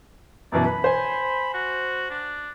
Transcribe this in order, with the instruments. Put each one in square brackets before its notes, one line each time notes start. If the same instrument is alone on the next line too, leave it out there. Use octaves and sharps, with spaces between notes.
[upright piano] F#2 B2 E3 [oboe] D5
[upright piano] B4 [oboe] B5
[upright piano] C5 G#5
[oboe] F#4
D4